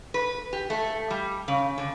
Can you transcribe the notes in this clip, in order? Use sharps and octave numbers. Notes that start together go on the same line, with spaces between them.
B4
G4
A3
G3
C#3
D3